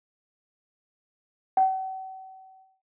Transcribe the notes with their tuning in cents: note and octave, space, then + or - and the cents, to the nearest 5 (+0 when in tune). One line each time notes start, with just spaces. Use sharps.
F#5 +45